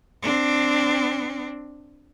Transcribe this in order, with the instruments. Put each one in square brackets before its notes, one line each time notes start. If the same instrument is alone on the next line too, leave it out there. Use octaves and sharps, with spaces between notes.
[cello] C4 D4